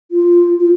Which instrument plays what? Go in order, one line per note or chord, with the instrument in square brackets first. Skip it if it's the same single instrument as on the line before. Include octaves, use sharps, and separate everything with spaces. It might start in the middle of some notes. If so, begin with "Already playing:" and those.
[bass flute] F4
F4